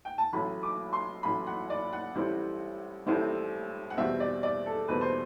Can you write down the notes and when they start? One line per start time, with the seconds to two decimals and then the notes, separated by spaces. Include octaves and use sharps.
0.05 G5
0.18 A5
0.32 A1 A2 F#3 B5
0.63 D6
0.93 C6
1.23 A1 A2 F#3 B5
1.47 F#5
1.70 D5
1.93 F#5
2.15 A1 A2 G3 C4 E4
3.06 A1 A2 G3 C4 E4
3.90 F#5
3.97 E2 B2 G3 C4 E5
4.20 D5
4.43 D5
4.66 A4
4.88 E2 B2 G3 C4 B4
5.01 C5